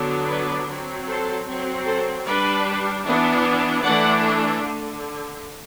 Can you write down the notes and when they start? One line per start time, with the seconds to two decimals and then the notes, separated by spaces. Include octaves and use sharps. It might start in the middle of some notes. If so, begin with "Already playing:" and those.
Already playing: D3 F#3 B3 D4
0.28 B4 D5
0.67 F#3 C4
1.07 A4 C5
1.46 F#3 C4
1.85 A4 C5
2.25 G3 D4 B4 D5
3.04 E3 B3 D4
3.83 E3 A3 D4 D5 F#5
4.62 D3